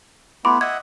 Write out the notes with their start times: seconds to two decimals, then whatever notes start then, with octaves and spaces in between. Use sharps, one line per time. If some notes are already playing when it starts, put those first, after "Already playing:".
0.45 A3 B3 E4 B5 C6 D6
0.61 D#5 E5 F#5 G#6